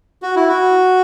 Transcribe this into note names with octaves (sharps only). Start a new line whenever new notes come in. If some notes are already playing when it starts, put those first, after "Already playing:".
F#4
E4
F#4